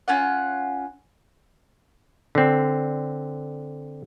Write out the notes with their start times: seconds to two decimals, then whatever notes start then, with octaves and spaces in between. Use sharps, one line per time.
0.08 C#4 F4 F#5
2.35 D3 C4